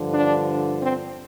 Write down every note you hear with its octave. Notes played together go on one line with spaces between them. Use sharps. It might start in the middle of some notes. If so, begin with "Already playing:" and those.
Already playing: G2 D3 F3
D4
C4